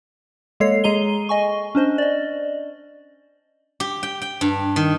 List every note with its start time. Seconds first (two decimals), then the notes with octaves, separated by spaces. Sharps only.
0.60 G#3 A#3 A4 C#5 C7
0.84 G#3 G#4 A#5 D#7 G7
1.29 D#5 G#5 C#6
1.75 C#4 D4 C5 D#5
1.98 D5 D#5
3.80 G4
4.03 G5
4.22 G5
4.41 G2
4.76 D#3